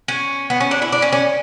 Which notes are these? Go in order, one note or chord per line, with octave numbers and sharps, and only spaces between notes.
C#4
B3
C#4
D4
E4
D4
C#4
C#4